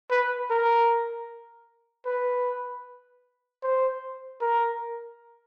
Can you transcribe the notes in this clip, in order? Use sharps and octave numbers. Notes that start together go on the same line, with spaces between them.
B4
A#4
B4
C5
A#4